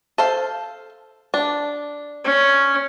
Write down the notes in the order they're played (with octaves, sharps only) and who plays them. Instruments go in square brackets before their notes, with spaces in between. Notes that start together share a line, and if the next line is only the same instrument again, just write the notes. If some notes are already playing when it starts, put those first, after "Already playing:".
[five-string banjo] A4 C5 F5
D4
[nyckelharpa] C#4